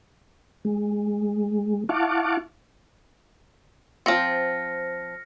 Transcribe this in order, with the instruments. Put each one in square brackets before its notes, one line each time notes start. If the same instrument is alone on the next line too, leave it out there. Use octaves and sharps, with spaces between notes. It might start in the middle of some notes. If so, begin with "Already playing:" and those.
[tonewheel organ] G#3
E4 F5 F#5 A5 C#6 D6
[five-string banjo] F3 C4 [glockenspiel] F6 A#6 C#7